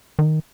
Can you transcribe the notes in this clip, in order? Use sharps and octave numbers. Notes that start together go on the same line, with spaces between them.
D#3